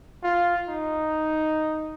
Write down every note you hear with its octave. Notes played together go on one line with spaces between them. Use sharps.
F4
D#4